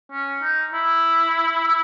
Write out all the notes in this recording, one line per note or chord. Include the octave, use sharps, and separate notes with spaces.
C#4
D#4
E4